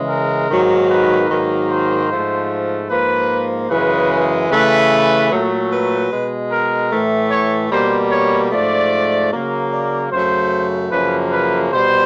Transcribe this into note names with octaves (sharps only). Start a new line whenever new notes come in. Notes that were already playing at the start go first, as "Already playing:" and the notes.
Already playing: C#3 E3 G#3
A#4
G#2 D#3 F#3 A#3
B4
G#2 D#3 F#3 A#3
C5
G#2 F3 A3
G#2 F3 A#3 B4
F#2 C#3 E3 G#3 B4
C#3 E3 A3 B4
A#2 F#3 A3
B4
B2 G#3
A#4
A2 E3 A3
C#5
B2 G3 A#3 C5
C#5
G#2 F3 A3 D5
C#3 F#3 A#3
D5
F#2 C#3 F#3 A3 C5
F#2 C#3 F3 A#3 B4
B4
B2 G3 C5